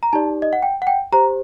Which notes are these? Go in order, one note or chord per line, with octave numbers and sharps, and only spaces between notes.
A#5
D#4 G4 D5 A5
D#5
F#5
G5
F#5
G5
G4 C5 A#5